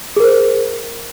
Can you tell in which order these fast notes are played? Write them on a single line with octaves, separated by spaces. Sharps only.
G#4 A#4 C5